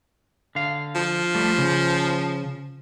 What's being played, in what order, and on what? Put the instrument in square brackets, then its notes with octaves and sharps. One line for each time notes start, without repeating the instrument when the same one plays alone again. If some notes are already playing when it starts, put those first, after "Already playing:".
[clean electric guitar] D3 F5
[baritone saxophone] F3
[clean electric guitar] G3 A3
C#3